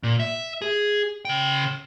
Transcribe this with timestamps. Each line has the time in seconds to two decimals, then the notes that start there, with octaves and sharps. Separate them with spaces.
0.03 A#2
0.20 E5
0.62 G#4
1.25 C#3 G5